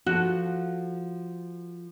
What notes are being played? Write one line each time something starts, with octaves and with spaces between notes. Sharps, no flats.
F3 F#4 A4